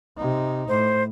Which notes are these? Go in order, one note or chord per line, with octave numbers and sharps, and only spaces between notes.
C3 D#4
A2 C5